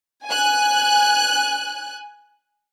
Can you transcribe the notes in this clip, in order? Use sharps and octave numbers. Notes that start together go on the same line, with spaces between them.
G#5 F#6